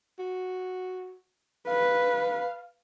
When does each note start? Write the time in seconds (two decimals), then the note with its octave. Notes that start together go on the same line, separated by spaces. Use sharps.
0.19 F#4
1.68 B4 F5